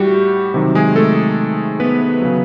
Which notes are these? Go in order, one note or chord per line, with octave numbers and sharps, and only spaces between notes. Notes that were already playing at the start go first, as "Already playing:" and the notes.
Already playing: A2 G3 F#4 G4
C3 D#3 F#3
G#3 G#4
A3 A4
B3 B4
C#3 F#3